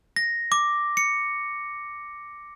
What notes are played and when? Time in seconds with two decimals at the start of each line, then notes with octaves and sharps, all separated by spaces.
0.16 A#6
0.52 D6
0.97 C#7